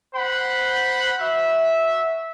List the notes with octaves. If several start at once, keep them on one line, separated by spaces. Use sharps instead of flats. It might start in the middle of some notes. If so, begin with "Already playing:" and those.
C5 F#5 B5
F#4 E5